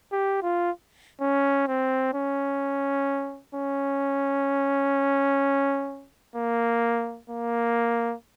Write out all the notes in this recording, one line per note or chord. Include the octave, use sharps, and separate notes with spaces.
G4
F4
C#4
C4
C#4
C#4
A#3
A#3